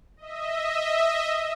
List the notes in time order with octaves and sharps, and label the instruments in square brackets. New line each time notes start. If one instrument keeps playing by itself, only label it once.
[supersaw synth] D#5 E5